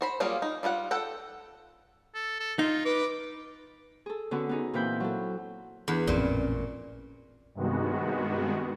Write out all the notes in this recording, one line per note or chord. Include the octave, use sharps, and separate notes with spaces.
F#4 C5 B5
F#3 G3 A#3 F4 G#4
D#4
G3 F4 G#4 F#5
A4 F#5 G5
A4
A4
D#4 F4
B4 D6
G#4 A4
D3 B3 C#4 D4 F#4
B3 D#4 G#4
A#2 E3 C4 E4 B5 G6
F#3 A4
E2 D4 B4
A1 F2 A#2 C4 C#4 D5
G2 C3 D#3 G#3 B3 F#4